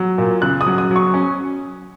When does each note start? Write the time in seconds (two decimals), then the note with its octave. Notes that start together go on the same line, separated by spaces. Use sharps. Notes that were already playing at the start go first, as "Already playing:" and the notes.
Already playing: F#3
0.18 A#2
0.42 C#3 F#6
0.61 D#6
0.66 F#3
0.78 D#6
0.91 F#3
0.96 C#6
1.14 C#4